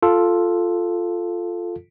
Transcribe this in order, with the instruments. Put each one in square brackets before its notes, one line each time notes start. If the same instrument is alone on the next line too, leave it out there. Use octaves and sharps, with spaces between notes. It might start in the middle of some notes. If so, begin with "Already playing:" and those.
[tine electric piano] F4 A4